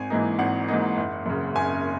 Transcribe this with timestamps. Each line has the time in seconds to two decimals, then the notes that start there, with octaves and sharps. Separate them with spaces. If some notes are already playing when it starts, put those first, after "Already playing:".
Already playing: G#1 G#5
0.10 G#2 E3 A#3 D#4
0.39 G#1 F#5
0.68 G#2 E3 A#3 D#4
0.97 F#1
1.26 F#2 C#3
1.55 F#1 G#5